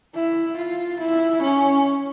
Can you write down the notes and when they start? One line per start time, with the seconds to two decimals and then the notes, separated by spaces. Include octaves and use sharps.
0.15 E4
0.57 F4
0.99 E4
1.42 C#4